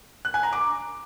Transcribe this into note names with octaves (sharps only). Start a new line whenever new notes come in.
F#6
G#5
A#5
D6